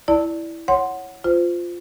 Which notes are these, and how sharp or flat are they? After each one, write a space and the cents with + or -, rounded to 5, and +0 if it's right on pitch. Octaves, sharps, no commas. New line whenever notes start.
E4 +0 D5 +0 A5 +25
C#5 +0 F#5 -5 C6 +0
F4 +0 C5 -25